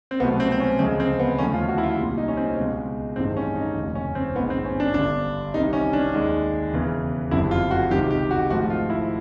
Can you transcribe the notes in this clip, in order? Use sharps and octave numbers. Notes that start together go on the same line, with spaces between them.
C4
C2 B2 F#3 A3 B3
C4
C4
C#4
D2 C#3 F3 G#3 C4
C4
B3
D#2 D3 F3 A3 C#4
F4
F#4
E4
F4
C2 A#2 G3
D#4
C#4
C4
C#2 B2 G#3
A1 G2 D#3 G#3 C4
C#4
D#4
F1 D#2 C#3
C#4
C4
A#1 G#2 D#3 B3
C4
C#4
D4
G1 G2 D3 D4
C2 C3 D#3 G3 D#4
C#4
D4
D#2 D#3 G#3
E1 E2 C#3 E3
F#1 F2 D3 G3 E4
F4
F#4
C#2 C3 D#3 G4
G4
F#4
G#1 G#2 F3 A3 F#4
F4
E4